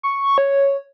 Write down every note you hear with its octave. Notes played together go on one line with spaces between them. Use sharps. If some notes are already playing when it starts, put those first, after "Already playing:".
C#6
C#5